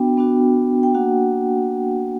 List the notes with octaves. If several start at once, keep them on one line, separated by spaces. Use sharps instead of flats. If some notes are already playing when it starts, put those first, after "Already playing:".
Already playing: B3 D4 F#4 G5
B3 D4 F#4
G5
A#3 D4 F#4 F#5